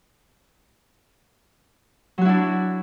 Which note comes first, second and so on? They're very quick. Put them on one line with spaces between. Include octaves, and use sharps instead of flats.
F#3 F#4 E4 D4